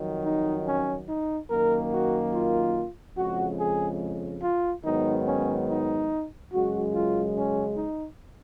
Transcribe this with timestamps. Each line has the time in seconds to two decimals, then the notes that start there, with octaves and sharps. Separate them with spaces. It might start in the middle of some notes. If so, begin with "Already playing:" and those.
Already playing: F2 D#3 F#3
0.25 D#4
0.66 C#4
1.08 D#4
1.50 F#2 D#3 A#3 A#4
1.92 F#4
2.33 F4
3.17 F2 C#3 G#3 F#4
3.59 G#4
4.43 F4
4.84 G#2 D#3 F#3 B3 D#4
5.27 C#4
5.68 D#4
6.52 F#2 C#3 G#3 F#4
6.94 F4
7.35 C#4
7.77 D#4